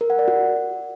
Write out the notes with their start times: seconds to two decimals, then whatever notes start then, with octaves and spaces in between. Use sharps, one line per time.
0.01 A#4
0.10 F#5
0.19 D5
0.28 F#4